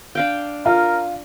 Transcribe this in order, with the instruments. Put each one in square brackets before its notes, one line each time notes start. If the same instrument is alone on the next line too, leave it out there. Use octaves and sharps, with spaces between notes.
[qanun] D4 F5 G5
[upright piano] F4 [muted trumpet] A#4